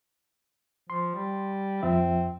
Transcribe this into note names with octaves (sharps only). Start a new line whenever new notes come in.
F3 C6
G3
F2 F3 C4 E5